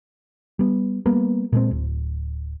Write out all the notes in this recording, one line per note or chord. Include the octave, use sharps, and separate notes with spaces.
G3 B3
G3 A#3 B3
A#2 G#3 A3 C4
D1